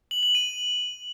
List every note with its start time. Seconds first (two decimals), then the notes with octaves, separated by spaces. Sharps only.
0.11 F#7
0.23 F#7
0.35 D#7